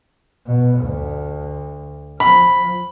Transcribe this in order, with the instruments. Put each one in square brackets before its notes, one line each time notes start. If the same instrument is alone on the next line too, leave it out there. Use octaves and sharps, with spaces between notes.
[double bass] B2
D2
[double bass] F3 [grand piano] B5